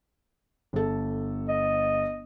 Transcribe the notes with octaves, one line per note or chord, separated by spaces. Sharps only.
G1 A4
D#5